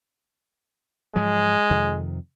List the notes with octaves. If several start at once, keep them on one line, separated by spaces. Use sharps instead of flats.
G#2 F3 F#3 G#3
F2 C3 D#3